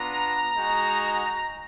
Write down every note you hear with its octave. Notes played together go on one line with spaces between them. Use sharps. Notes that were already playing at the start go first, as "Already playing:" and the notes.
Already playing: B3 D4 F4 A#5
G#3 D#4 F#4